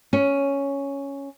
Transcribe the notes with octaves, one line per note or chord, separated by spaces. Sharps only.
C#4